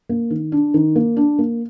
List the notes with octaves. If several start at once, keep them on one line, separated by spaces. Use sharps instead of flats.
A#3
D#3
D4
D#3
A#3
D4
A#3